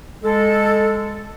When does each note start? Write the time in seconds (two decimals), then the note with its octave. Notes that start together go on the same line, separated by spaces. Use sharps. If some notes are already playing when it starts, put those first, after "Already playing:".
0.24 G#3 A4